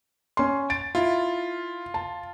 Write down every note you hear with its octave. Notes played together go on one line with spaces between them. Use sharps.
C#4 C6
A6 D7
E4 F4
A5